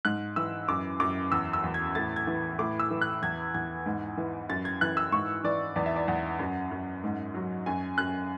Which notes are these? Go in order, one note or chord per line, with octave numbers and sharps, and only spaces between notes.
G#2 F#6
E3 E6
F#2 D6
F#2 D6
E2 E6
E6
E2
G#6
A2 A6
G#6
E3
A2 D6
E6
E3
F#6
E2 G#6
E2 G#6
G#2
E3
F#2 A6
G#6
E3 F#6
E6
G#2 C#6
E3 D5
E2 D5
E5
D5
E2 F#5
F#2
F#2
G#2
F#3
F#2 G#5
F#2 F#6